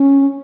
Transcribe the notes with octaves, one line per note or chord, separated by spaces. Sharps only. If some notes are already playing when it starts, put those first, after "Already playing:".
Already playing: C#4